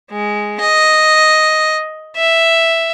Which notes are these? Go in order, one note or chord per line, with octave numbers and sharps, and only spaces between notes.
G#3
D#5
E5